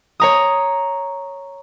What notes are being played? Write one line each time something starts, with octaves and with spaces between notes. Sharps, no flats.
C#5 A#5 D#6